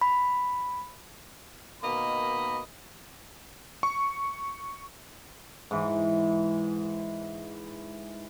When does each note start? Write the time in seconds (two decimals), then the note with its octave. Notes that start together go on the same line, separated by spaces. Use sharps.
0.01 B5
1.83 B2 D#3 A#3 D#5 B5
3.83 C#6
5.71 G#2 E3